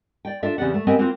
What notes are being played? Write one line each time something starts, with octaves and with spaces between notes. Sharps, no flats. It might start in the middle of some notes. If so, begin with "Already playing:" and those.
D5 G5
D4 F4 A4 E5
E2 C#3 C4 G4 D5 F#5
A3
B3 C4 G4 A#4 D#5 G#5
A#3 C4 F4 F#4 B4 C5